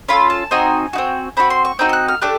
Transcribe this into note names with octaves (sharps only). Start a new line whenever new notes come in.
C#4 F4 A4 B5
A5
C4 D#4 F#4 G#5
C4 D#4 F#4
C4 D#4 F#4 B5
C6
C#6
C4 D#4 F#4 G6
G6
F#6
F6
A3 D4 G4 F#6